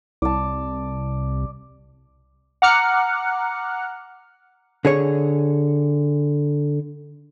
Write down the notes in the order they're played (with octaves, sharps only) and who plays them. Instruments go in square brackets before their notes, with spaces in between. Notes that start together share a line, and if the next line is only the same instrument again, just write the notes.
[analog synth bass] C2 [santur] D5 A5
[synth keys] F#5 A#5 D6 F6 F#6 C#7
[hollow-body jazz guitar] D3 G#4 C#5